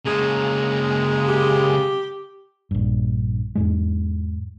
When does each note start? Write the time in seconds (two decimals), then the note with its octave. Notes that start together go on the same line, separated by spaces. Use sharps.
0.06 C#3 G#3 A#3
1.28 G4
2.71 A#1 G2
3.55 E2 G#2 G#3